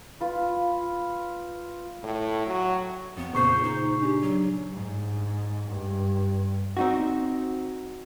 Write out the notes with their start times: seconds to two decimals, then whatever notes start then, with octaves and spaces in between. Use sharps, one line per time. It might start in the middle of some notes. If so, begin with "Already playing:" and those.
0.20 F4 B4
2.04 A2
2.47 F#3
3.17 F2 B3
3.35 A#2 C#3 C5 C#6 C7
3.63 D#4
4.02 D4 G4
4.21 F#3
4.73 G#2
5.68 G2
6.77 C4 D#4 F#4